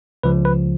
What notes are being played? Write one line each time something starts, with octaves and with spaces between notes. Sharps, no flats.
C#2 C#3 F3 B4
B4